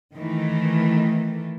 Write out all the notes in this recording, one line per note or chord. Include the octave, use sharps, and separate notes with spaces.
D#3 E3 A3